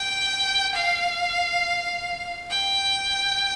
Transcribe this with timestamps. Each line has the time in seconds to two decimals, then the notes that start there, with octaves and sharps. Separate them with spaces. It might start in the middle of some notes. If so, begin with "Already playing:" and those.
Already playing: G5
0.75 F5
2.50 G5